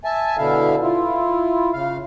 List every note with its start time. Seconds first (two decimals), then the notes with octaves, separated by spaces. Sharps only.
0.04 E5 G#5 A5
0.37 B2 D3 E4 E5 F5
0.83 E4 F4
1.73 C#3 F5